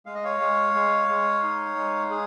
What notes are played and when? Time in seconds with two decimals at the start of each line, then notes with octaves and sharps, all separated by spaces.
0.06 G#3 F5
0.15 D#5
0.24 C#5 F5
0.40 G#3
0.74 G#3
1.08 G#3
1.43 D#4
1.77 G#3
2.11 G#4